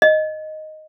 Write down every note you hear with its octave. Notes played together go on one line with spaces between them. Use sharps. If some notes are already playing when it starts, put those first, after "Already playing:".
D#5